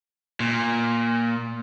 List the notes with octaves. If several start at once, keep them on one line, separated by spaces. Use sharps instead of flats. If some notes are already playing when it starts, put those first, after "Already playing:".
A#2